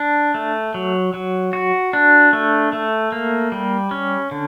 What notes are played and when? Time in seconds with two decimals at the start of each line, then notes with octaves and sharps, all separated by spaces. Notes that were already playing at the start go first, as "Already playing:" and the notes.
Already playing: D4
0.34 A3
0.74 F#3
1.14 F#3
1.53 F#4
1.93 D4
2.33 A3
2.73 A3
3.12 A#3
3.52 G3
3.91 C#4
4.31 D3